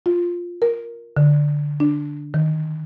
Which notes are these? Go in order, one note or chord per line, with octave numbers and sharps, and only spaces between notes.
F4
A#4
D3
D4
D#3